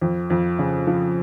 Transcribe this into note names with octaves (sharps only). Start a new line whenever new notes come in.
F2
F2
C#3
F3